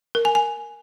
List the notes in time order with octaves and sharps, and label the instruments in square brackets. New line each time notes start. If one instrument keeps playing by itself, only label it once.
[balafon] A#4
G#5
G#5